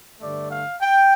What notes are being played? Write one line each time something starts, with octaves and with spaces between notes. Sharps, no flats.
G2 D3 A3 D5
F5
G5